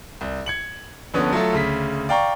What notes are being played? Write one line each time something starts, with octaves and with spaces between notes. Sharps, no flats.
C2
G#6 C#7 F#7
A#1 D3 B3 C#4 D#6
F#3 A3 F4 A4
D2 C#3 B6
D5 F5 G5 A#5 C#6